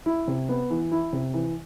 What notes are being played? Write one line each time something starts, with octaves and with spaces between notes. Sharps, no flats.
E4
C3
B3
E3
E4
C3
E3